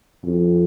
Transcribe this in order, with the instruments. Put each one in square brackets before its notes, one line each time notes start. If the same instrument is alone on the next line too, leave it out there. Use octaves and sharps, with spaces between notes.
[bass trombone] F2